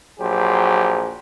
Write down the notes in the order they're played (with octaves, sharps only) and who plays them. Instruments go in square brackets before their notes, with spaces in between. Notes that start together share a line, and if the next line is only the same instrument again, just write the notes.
[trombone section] A#1 F#3 G4 G#4 C5